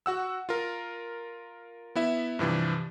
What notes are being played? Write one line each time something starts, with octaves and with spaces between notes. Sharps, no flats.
F#4 F#5 E6
F4 A#4
B3 E4 E5
G2 C3 E3 F3